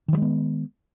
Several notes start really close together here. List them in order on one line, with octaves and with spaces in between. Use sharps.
D#3 F3 G#3 B3